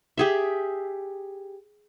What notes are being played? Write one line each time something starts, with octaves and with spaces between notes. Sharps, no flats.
G4 G#4 E5